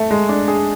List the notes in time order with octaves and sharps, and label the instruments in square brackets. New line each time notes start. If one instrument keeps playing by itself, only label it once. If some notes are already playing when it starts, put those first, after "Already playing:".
Already playing: [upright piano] A3
G#3
D4
G#4